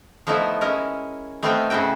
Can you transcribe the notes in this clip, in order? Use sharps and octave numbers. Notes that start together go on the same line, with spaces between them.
F3 A3 B3 D#4 E4
G#3 C#4 E4 A#4
A3 B3 C4 D#4 F5 G5
C#3 C#4 E4 F#4 G5